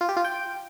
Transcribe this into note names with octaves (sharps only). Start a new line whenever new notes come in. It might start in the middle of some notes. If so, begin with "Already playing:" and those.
F4
G4
F4
G5